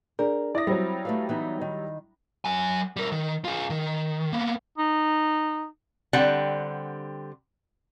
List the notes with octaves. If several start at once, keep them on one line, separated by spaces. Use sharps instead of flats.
D4 G#4 A#4 D5
E4 D5 E5 D#6 A#6
F#3 G3 C4
A3 B4 F5
E3 B3 D#4
D#3
F#3 G#5
G3 A#4
D#3
F4 G#4
D#3
A#3 B3
D#4
D3 G3 C4 F#5